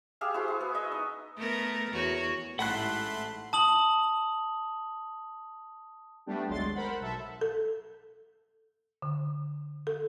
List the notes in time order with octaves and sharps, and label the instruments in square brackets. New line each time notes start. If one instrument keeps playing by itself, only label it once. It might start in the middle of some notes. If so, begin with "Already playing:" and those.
[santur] G4 G#4 E5 F5
E4 F#4 G#4 C5
G#4
B3
D#5 E5
D#4
[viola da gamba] A3 B3 A#4
E2 F#4 C#5
[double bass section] A1 G#2 [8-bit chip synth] A3 B5 C6 [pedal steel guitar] F#5 A5 F#6
[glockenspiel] A5 D#6 F#7
[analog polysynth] G3 A3 B3 D4 G4
G#1 D2 F#3 G#3 C6 A6
A#4 C5 F#5 B5
B1 A4 E5
[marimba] A4
D3
A4